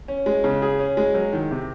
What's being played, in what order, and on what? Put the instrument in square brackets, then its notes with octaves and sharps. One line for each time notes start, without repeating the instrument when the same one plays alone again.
[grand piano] C#4
G#3
C#3
G#4
C#4
G#3
F#3
D#3
C3